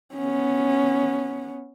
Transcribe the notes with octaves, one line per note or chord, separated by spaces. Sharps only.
B3 C#4